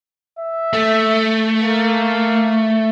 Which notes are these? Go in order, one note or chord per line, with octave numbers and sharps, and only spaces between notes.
E5
A3
A#3